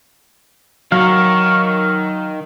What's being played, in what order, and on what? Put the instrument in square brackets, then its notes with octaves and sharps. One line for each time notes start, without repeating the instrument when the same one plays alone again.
[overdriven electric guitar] D#3 [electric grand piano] F#3 [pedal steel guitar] A#4 F5 [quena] C#6